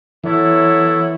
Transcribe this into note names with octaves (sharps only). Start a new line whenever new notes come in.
E3 F#3 B3 E4 A4 C#5